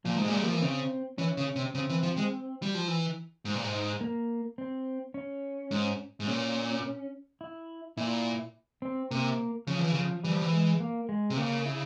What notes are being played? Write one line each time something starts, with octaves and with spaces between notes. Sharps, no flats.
A#2 F3
G#2
A#2 G#3
G3
F3 A#3
E3
C#3 C4
E3 C#4
C#3
C3
C#3 C4
E3
F3
G#3
G3
F3
E3
G#2
A#2
G#2
A#3
C4
C#4
G#2
G#2
A#2 C#4
E4
A#2 E4
C4
C3 A#3
C#3 F3
E3
C#3 F3
E3 G3
F3
E3
G#3
A#3
G#3
C3
C#3 A#3
E4